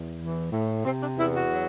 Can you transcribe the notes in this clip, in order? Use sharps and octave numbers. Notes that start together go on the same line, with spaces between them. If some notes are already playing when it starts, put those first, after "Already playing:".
Already playing: E2
E3
A2
C3 C4
D4
E2 E4
F#4
F#3